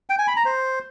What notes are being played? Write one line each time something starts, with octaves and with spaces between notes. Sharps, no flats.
G5
G#5
B5
A#5
C5